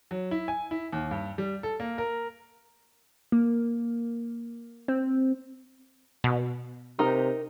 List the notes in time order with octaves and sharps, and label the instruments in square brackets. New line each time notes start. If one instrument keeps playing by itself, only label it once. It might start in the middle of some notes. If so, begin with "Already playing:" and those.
[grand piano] F#3
E4
G#5
E4
D#2
G2
G3
A4
A#3
A#4
[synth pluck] A#3
C4
B2
[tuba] C3 [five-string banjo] D#4 A#4